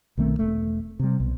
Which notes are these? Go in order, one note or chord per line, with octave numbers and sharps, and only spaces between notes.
B1 D#3 A3 C4
E1 A3
C3 G3
B1